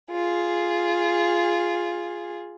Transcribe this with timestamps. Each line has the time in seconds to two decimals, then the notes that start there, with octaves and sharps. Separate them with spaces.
0.10 F4 G#4